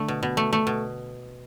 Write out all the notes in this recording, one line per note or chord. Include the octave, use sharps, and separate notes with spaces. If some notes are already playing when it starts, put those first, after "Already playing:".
Already playing: D3 A3
B2
B2
A3
A3
B2